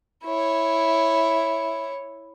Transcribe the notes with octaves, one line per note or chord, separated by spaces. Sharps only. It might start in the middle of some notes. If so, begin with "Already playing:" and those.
E4 C#5